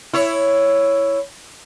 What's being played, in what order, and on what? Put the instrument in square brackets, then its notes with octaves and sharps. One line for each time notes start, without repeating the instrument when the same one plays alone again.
[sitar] E4 C#5